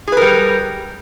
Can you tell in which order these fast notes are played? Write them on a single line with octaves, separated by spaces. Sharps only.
G#4 B4 A#4 G3